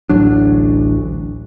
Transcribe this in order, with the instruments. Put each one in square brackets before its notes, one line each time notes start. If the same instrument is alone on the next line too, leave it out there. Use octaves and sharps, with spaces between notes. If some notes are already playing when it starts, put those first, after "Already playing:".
[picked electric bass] A1 D2 F#3 D4